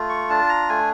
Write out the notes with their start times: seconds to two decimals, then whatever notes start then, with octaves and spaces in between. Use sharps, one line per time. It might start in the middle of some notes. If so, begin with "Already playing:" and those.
Already playing: A3 F4
0.09 C#6
0.30 D4 A5
0.49 A#5
0.69 A3 G#5